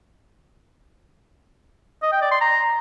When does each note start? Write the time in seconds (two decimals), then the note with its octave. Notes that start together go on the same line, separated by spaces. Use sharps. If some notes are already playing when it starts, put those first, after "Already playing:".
2.02 D#5
2.12 G5
2.22 D5
2.31 C6
2.41 A#5